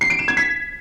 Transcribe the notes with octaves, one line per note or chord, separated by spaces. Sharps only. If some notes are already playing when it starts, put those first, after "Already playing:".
C7
D7
E7
G#6
B6